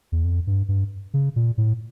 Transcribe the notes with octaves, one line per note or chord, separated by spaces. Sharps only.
E2
F2
G2
G2
C#3
A#2
A2